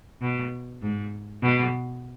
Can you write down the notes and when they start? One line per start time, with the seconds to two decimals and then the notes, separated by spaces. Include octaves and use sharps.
0.21 B2
0.82 G#2
1.42 B2